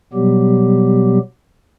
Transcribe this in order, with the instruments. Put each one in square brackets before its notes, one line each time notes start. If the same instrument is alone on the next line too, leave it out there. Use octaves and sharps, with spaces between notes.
[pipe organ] B2 F#3 G3 B3 G4